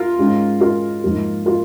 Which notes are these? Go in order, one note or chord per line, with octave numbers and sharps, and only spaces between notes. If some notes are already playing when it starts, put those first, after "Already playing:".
Already playing: F4 A#4
G#2 G#3 C#4
F4 A#4
G#2 F3 A#3
F4 A#4